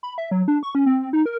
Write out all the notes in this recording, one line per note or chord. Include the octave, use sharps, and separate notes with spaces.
B5
E5
F#3
D4
C#6
C#4
C4
D#4
A#4